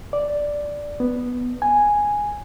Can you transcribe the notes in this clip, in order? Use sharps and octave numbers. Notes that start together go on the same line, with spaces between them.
D5
B3
G#5